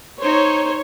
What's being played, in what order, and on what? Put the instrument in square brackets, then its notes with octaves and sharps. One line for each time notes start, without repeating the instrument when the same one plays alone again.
[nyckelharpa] D#4 C5 [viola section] C#5